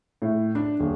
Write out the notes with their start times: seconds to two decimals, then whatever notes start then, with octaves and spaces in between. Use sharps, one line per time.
0.22 A2
0.55 D4
0.80 D#1